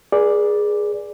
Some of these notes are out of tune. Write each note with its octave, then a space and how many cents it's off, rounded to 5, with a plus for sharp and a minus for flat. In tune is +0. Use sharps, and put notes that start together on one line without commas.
G#4 +0 B4 -45 D5 +0